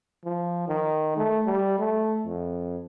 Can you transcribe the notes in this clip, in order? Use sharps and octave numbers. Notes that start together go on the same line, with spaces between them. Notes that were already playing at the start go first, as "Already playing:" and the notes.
F3
D#3
A3
G3
A3
F2